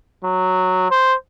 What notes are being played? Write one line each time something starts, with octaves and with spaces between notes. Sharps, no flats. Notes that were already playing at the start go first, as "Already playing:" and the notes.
F#3
C5